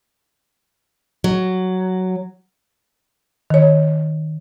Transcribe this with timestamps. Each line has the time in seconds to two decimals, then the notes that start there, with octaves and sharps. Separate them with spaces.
1.24 F#3
3.50 D#3 C#5